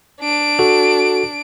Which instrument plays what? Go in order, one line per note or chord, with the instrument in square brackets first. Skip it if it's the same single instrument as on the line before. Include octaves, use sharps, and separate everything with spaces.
[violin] D4 D7
[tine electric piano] F#4 A4